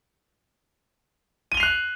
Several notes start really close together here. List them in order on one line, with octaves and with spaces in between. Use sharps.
D#7 G7 F7 C7 F#6